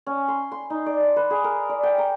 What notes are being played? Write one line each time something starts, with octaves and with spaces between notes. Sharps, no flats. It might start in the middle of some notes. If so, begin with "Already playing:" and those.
C#4
C6
C6
D#4
D5
A5
B4
G#4
A#4
D5
G5
A#5